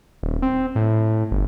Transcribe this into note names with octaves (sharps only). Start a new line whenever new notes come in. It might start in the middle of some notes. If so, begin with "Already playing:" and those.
D#1
C4
A2
G1